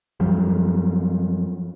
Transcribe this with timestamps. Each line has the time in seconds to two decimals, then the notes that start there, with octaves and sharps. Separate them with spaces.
0.20 F#2 F3 G3